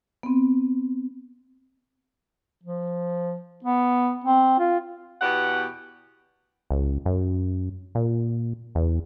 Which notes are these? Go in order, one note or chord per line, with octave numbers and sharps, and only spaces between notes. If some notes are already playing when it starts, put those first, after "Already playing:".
B3 C4
F3
B3
C4
F4
E2 B2 G4 F#5
C#2
F#2
A#2
E2